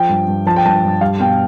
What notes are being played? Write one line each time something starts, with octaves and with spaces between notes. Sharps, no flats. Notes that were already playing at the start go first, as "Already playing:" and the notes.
Already playing: F3 G5
G2
G2
F3 A5
G5
G2 A5
G2
G3 F5
B2 G5